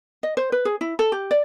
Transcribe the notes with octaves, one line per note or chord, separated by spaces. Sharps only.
D#5
C5
B4
G#4
E4
A4
G4
D5